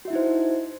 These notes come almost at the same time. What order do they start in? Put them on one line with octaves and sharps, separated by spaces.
F#4 E5 E4 D#4 C5